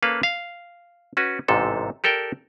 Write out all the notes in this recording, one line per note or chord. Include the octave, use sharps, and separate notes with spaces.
A#3 C#4 A4 B4 F5
F5
C#4 F#4 B4
A1 G#2 C3 A4
G4 A4 A#4 D5 G5